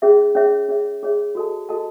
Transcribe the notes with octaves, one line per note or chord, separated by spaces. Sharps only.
C#4 G#4 C#5 E5
C#4 G#4 C#5 E5
C#4 G#4 C#5 E5
C#4 G#4 C#5 E5
F#4 A4 D#5 A5
F#4 A4 D#5 A5